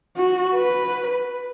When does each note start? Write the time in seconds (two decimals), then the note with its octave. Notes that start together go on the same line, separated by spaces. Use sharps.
0.17 F#4
0.55 B4